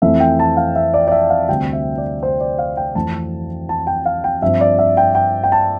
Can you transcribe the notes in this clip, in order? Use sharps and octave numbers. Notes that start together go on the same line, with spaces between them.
F2 E3 A3 C4 E5
G5
A5
F5
E5
D5
D5
E5
F5
D2 C3 G3 C4 G5
E5
D5
C5
D5
F5
G5
F2 E3 A3 C4 A5
A5
G5
F5
G5
G2 F3 C4 E5
D5
E5
G5
G5
G5
A5